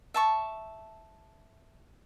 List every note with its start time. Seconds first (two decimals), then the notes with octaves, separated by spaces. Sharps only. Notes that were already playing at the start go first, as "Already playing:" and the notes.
0.14 E5 A5 C#6